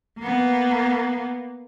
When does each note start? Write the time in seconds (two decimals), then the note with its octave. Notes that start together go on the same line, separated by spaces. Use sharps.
0.19 A#3 B3